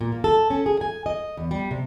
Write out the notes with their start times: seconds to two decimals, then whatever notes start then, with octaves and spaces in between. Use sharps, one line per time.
0.01 A#2
0.12 A#3
0.24 A4
0.50 C#4
0.66 G#4
0.81 G#5
1.06 D#5
1.37 E2
1.51 G3
1.71 C3